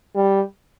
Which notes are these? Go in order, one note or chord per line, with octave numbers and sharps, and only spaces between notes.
G3